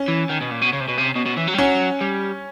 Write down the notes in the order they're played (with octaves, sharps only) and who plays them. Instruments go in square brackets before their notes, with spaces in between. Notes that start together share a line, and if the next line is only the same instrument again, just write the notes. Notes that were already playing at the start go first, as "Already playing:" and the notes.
Already playing: [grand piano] C#4
[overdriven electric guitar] E3
D#3
B2
A#2
B2
C#3
C3
B2
C3
B2
B2
E3
F#3
G3
[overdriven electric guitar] F#3 [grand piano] C#4
[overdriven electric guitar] G3